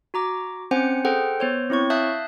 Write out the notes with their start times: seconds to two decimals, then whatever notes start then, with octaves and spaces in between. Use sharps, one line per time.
0.14 F#4 A#5 D6
0.71 C4 C#4 C5 F#5 G#5 C#7
1.05 G#4 A4 C5 F#5 G5
1.40 B3 C5 C#5
1.70 C4 E4 C#5 C#6
1.90 E5 F5 A5 D#6 F#6 G6